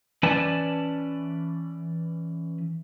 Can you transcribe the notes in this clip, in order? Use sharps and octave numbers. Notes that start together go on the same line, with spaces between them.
E3 C#4 B4 D5 G#5 A5